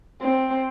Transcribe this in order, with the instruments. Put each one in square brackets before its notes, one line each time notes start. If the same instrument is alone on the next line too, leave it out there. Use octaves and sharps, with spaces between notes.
[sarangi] C4